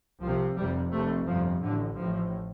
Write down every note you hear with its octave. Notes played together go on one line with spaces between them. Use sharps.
C2 C3 F3
F1 F2 C3 G3
F1 F2 C3 A3
G1 F2 C3 F3
A1 A2 D3
A1 A2 F3